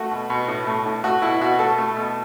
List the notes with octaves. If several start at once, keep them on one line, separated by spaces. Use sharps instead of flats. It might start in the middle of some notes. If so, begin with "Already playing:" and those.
Already playing: A3 F#4
B2
B2
A2
A3
A2
A3 F#4
B2 E4
B2 F#4
A3 A4
A3
B2